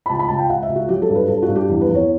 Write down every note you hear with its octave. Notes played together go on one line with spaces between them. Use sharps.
B5
C#2 A5
B5
C#2 A5
G5
C#2 F#5
E5
C#2
F#4
F#3 G4
A4
G2
B4
G2 A4
F#4
G2
G4
E2 G4
B4
E2
C#5